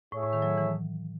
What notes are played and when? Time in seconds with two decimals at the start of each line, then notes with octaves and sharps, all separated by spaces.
0.12 A2 A3 E4 G#4 C#5 E5
0.23 A2
0.33 D#3
0.42 F#3
0.58 E3